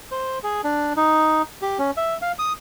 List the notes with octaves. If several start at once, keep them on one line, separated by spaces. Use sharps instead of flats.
C5
G#4
D4
D#4
G4
C#4
E5
F5
D#6